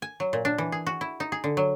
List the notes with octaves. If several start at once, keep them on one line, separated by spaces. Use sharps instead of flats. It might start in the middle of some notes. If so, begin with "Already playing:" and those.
G#5
F#3
A#2
D4
E3
G#4
F#4
E4
D#4
G#4
D3
F#3